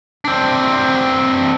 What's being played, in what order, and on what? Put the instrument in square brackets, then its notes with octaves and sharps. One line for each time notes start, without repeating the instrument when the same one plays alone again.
[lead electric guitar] C4 D4